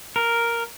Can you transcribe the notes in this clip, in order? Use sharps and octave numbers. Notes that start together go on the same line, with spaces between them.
A#4